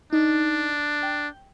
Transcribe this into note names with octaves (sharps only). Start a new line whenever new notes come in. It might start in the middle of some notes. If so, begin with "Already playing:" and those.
D4 D#4
G5